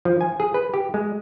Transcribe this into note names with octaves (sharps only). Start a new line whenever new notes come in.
F3
G#5
G#4
B4
G4
G#3